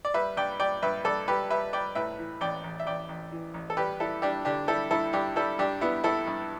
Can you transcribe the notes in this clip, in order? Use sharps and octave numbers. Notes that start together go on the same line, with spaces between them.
D5
G3 B4 E5
G2 D5 G5
G3 D5 G5
G2 B4 E5
G2 A4 D5
G3 G4 B4
G3 B4 E5
G3 D5 G5
A2 B4 E5
E3
A1 D5 G5
A1
E5
A1 D5 G5
A1
E3
A1
A4
G3 G4 B4
G3 E4 A4
G3 D4 G4
D3 D4 G4
G3 E4 A4
G2 E4 A4
G2 D4 G4
G3 E4 A4
G2 D4 G4
G3 B3 E4
G2 E4 A4
G2